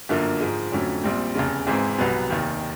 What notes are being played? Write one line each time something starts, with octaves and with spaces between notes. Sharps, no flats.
G1 F#2 D3 F3 A#3
G#2 F3 G#3
F2 D3 F#3 A3 C#4
A#1 A#2 G3 C4
F1 E2 C#3
G#1 G#2 E3 G#3 C4
C2 B2 F#3 B3
F1 D#2 D#3